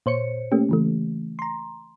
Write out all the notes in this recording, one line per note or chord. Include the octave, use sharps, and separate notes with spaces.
A#2 C5 C#5 C#7
A3 A#3 C#4 G4
C#3 E3 A3
A#5 C6